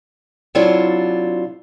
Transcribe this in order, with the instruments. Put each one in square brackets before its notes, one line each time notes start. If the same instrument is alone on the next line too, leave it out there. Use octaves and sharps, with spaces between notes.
[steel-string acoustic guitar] C3 F#3 D4 E4 F4